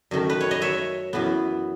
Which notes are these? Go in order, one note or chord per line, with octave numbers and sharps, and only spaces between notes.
F#2 D#3 A3
B4
C#5
D#5
C#5 E5
F#2 E3 B3